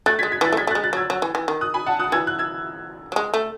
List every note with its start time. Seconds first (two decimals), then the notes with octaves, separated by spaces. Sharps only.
0.06 A3 F#6 A6
0.19 G#3 G#6 B6
0.32 G#6 B6
0.41 E3 F#6 A6
0.52 A3
0.57 G#3 G#6 B6
0.67 A3
0.71 F#6 A6
0.75 G#3
0.83 F#6 A6
0.93 F#3 E6 G#6
1.10 F#3
1.22 E3
1.35 E3
1.48 D#3
1.61 D#6 F#6
1.74 G#5 B5
1.86 F#5 A5
2.00 D#6 F#6
2.12 E3 E6 G#6
2.27 F#6
2.39 E6 G#6
3.12 F#3
3.16 G#3
3.34 A3